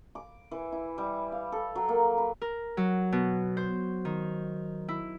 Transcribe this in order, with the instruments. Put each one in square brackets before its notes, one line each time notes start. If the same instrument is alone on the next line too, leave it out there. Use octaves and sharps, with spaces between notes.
[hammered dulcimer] D6
E3
E4
G3
F5
A4
F#3
A#3
B4
[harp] A#4
F#3
B2
C5
D#3
E4